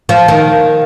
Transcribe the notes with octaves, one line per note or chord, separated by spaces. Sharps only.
F3
D#3